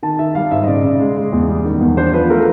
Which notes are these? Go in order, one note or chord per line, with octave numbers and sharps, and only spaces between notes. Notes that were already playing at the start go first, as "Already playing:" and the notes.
D#3 A5
D#3 E5
G3 F5
G#2 E5
D#5
C#3 D5
C#3
G#3
G#3
E2
G3
D#3
E2
D4 C5
F3 B4
A3 A#4